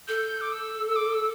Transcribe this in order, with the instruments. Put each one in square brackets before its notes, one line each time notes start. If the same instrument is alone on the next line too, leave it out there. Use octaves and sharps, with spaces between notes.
[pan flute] A4 [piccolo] G6
[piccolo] D6
E6
E6
D6
E6